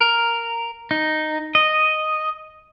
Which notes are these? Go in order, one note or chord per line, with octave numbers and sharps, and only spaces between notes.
A#4
D#4
D#5